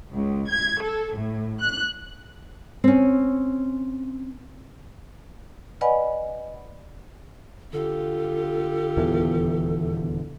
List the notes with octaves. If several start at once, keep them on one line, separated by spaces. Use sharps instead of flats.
C#2
G#6
A4
A2
F#6
C4 C#4
B4 D5 D#5 F#5 G#5 B5
D3 F4 G4 A4
D#1 E2 E3